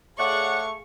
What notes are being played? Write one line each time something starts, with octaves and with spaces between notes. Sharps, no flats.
A3 G#4 C#5 D5 F5 F#5 C#6